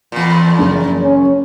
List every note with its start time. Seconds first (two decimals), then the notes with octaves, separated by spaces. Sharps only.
0.12 E2 A#2
0.59 F#1
1.02 C#4